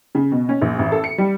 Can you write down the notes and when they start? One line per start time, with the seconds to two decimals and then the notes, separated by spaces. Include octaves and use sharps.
0.15 C#3
0.32 B2
0.49 C#4
0.62 A#1
0.79 A1
0.92 A4
1.04 C#7
1.18 G3